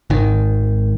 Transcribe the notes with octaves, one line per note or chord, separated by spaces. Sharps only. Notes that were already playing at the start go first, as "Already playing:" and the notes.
G#1 D#3